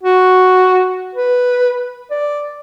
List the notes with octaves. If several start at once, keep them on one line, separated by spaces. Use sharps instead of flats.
F#4
B4
D5